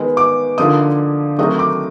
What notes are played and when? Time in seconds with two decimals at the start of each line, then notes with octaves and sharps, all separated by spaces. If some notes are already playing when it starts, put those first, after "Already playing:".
Already playing: D#3 G#3 B3
0.17 D6
0.58 D3 F3 A#3 D#4 D#6
1.38 D#3 F#3 A3 C4 D#4 D#6
1.59 D6